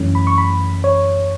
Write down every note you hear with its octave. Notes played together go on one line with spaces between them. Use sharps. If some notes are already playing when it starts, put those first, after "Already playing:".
Already playing: F#2 E3 A3 C#4
B5
C#6
B5
C#5